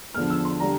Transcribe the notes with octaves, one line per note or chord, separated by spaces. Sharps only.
E2 D3 F3 F6
E6
C6
D3 G3 A#5